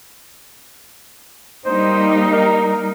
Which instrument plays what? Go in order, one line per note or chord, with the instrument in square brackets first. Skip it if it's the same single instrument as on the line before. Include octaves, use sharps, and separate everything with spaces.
[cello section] G3 A#3 D#4 [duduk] C5
[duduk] A#4